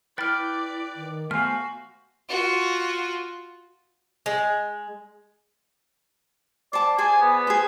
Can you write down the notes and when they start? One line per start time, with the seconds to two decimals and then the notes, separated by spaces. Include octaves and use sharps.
0.18 E4 B4 D5 G5 B5 F6 A6
0.96 D#3
1.31 A3 B3 F#4 C5 F5 G#5 F6
2.29 F4 F#4
4.26 G#3
6.73 C5 D5 A5 D6
6.98 G#4 C5 D5 G#5
7.21 B3
7.47 G#4 C5